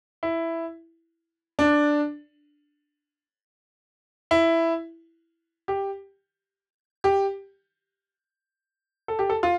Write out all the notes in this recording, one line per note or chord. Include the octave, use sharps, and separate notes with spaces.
E4
D4
E4
G4
G4
A4
G4
A4
F4